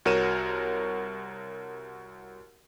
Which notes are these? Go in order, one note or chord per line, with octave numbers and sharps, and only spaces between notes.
C2 F#4 A#4 C#5 D#7 E7